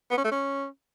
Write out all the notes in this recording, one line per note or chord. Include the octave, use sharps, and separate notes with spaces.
B3
C#4
A3
C#4